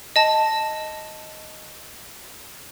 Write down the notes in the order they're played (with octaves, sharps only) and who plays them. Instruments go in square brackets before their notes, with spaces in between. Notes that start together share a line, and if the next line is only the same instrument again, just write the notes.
[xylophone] D#5 A5